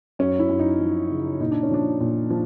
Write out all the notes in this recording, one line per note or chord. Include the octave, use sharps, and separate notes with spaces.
F#2 C#4
E4
F#2
D#4
F3
C#3
A#2 D#4
D4
C#4
F3 D4
A#2
F3